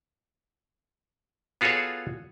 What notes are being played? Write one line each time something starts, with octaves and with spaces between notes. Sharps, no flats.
B3 F4 F#4 G#4 A4 C#5